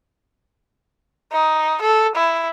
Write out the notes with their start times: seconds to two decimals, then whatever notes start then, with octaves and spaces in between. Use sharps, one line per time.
1.33 D#4
1.82 A4
2.15 E4